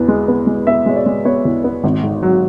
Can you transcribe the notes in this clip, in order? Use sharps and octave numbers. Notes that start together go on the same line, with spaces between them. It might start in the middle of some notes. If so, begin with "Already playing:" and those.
Already playing: E2 B3
G#3
B3
G#3
B3 E5
G#3 C#5
D5
G#3
B3 C#5
E2
B3
G#1
G#2
F#3